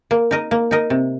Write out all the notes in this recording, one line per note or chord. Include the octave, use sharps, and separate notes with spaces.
A#3
D#4 A#4 D#5
A#3
D#4 A#4 D#5
C3